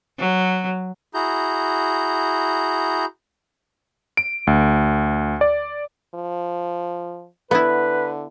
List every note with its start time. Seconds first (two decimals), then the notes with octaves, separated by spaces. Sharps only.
0.18 F#3
1.14 E4 F#4 G#4 A#5 G6
4.17 D7
4.47 D2
5.41 D5
6.14 F3
7.51 D3 B3 E4 B4